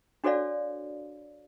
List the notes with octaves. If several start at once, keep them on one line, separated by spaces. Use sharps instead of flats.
D4 F#4 A4 C#5 D5 F5